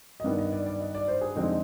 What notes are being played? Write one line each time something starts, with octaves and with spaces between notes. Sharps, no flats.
D#5
G2 D#3 B3 D5
D#5
D5
D5
D#5
D5
C5
G#4
F2 D3 G#3 C4 D#4